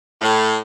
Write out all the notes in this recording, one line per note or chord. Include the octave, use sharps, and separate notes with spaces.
A2